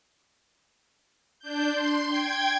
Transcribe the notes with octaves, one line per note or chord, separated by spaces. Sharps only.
D4 G6
C6
G5 G#6